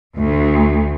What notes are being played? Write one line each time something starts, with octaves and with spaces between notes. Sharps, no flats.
D2